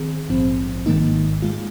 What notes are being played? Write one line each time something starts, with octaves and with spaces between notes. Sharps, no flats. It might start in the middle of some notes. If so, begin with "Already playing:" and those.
Already playing: D#3 C4 G#4
A#1 G#2 F3 C4
G#1 G#2 D#3 A#3 D#4
G#3 F4